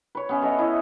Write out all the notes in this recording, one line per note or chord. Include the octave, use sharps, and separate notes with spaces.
B4 C#5
B3 C#4 E5
A4 C#5 D#5 F#5
E4 D#5